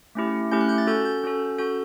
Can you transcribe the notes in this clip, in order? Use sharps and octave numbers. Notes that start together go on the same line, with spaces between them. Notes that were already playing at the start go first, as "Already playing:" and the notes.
A3 C#4 E4 G4
A3 C#4 E4 G4 G6
F#6
G6
A6
C#4 F#4 A4 G6
G6
C#4 F#4 A4
C#4 F#4 A4 G6